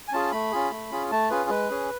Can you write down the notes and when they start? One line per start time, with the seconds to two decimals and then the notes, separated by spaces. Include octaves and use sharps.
0.08 G#5
0.12 C#4 F4 G#4 A5
0.32 A3 B5
0.52 C#4 F4 G#4
0.71 A3
0.91 C#4 F4 G#4
1.11 A3 A5
1.30 C#4 F4 G#4 B4
1.50 G#3 B4
1.70 C#4 G#4